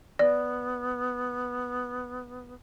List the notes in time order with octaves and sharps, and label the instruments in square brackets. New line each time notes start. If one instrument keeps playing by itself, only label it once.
[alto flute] B3 [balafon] D5